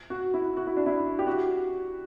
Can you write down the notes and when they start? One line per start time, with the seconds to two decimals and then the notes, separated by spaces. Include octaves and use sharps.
0.10 F#4
0.34 E4
0.57 F#4
0.67 E4
0.77 D4
0.86 E4
1.19 G4
1.27 F#4